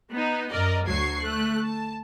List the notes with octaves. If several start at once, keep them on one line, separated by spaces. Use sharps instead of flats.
B3 D#4
F#2 A#4 D5 D#5
D2 F#3 C#6 G#6 C7
A3 F#6
A5